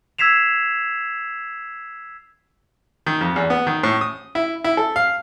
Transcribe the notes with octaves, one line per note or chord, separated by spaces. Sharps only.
E6 G#6 B6 C7 E7 F7
D#3
F2
E2
B3
D#3
A2
D#6
E4
E4
A4
F5